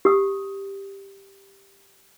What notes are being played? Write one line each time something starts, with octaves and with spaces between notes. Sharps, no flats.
G4 D#6